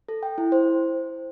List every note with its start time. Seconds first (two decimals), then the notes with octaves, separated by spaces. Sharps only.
0.08 A4
0.23 G5
0.38 E4
0.52 C5